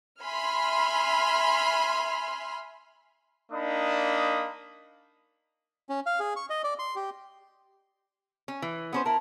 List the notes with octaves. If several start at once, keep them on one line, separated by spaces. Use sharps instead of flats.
E5 G#5 B5 C6 F6
A#3 D4 D#4 B5 D#6
C#4
F5
G#4
C#6
D#5
D5
C6
G4
C#4
E3
B3 C#4 C5
E4 A#4 A5